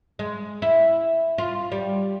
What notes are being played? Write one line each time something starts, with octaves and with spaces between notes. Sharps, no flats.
G#3
E4
F4
G3